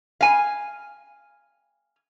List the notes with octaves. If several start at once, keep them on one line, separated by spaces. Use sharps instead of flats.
F5 G#5